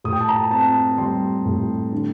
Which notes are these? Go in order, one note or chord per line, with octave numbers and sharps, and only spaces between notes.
A2 D#6
G5
A5
A#5
C4 A5
G3 C6
A2
D3